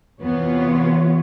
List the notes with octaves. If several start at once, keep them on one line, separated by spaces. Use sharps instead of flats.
E2 C3 E3 B3 F4 C#5